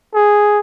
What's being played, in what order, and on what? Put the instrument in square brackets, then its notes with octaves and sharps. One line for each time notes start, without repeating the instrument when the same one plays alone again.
[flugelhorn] G#4